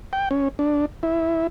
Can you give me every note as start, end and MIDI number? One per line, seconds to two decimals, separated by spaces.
0.13 0.29 79
0.31 0.48 61
0.59 0.86 62
1.03 1.47 64